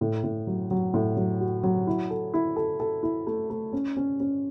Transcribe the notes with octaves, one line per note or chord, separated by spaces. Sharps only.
A2
A2
F#3
F#3
A2
F#3
F#4
F#3
E4
A4
E4
A4
A4
E4
A3
A3
C#4
C#4
C#4